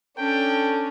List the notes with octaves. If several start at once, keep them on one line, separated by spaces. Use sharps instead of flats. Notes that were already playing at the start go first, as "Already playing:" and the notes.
C#4 D4 A4 G5